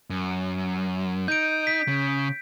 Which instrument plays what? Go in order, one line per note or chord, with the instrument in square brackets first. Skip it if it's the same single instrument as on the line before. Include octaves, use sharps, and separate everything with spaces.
[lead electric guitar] F#2
[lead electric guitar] D#4 [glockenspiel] G6 D7
[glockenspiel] B6
[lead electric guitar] C#3